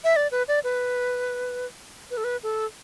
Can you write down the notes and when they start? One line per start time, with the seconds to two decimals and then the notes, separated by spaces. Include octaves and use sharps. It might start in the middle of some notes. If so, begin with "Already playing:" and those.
0.04 E5
0.16 D5
0.31 B4
0.48 D5
0.64 B4
2.11 B4
2.17 A4
2.24 B4
2.43 A4